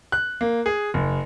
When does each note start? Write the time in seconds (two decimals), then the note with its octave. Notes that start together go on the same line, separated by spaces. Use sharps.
0.12 F#6
0.41 A#3
0.66 G#4
0.94 F#1